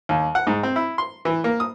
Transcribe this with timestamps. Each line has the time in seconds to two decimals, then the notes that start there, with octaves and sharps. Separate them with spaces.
0.09 D#2
0.35 F#5
0.47 G#2
0.63 C4
0.76 E4
0.98 C6
1.25 E3
1.44 A#3
1.60 D#6